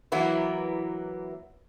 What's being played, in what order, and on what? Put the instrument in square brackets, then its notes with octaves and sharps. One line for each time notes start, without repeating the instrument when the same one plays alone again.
[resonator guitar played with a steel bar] E3 F#3 A#3 B3 E4